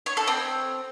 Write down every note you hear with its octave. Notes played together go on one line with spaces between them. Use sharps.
C#5
A4
C4